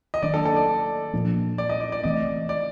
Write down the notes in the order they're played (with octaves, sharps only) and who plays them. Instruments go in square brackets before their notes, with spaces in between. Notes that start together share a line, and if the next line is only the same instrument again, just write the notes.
[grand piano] D#5
[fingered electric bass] D#3 F#3 A#3 D4 [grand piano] D5
[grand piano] A4
A4
D5
[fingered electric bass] A#2 F3 A#3 D4
[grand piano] D5
D#5
D5
D5
[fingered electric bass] E3 A3 C4 [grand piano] D#5
[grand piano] D5